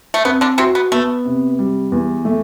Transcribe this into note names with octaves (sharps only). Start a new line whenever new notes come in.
A3
B3 C4
D3 D4
C3 C4 F#4
B3
A3 B3
C3
G3
E2
A3